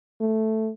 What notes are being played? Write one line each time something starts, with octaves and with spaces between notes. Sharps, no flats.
A3